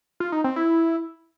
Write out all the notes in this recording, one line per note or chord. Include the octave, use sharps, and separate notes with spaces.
F4
D#4
C4
E4